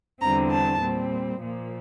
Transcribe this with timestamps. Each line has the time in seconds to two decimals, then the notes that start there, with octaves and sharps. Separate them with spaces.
0.21 E2 D3 G3 C4 A#5
0.51 A5
0.80 A#2 G3 C4
1.39 A#2 F3 A#3